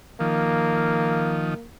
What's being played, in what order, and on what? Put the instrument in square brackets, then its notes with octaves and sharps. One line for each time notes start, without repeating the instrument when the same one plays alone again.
[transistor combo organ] D#3 F3 [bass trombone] A#3